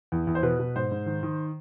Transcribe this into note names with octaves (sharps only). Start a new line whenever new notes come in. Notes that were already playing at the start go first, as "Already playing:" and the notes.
E2
E2
C5
B2 B4
B2
G#2 C5
G#2
D#3
D#3